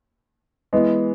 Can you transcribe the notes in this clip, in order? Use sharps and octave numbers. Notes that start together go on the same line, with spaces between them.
E3 G#3 B3